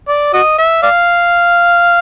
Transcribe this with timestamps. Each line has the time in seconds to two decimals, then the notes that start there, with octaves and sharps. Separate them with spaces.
0.08 D5
0.34 F#4 D#5
0.58 E5
0.83 D5 F5